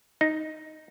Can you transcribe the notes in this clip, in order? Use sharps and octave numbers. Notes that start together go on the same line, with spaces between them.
D#4